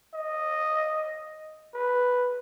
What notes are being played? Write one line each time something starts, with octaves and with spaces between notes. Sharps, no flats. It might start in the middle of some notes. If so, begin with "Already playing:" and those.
D#5
B4